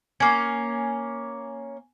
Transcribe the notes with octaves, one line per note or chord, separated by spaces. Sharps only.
A#3 C#4 G#5 G#6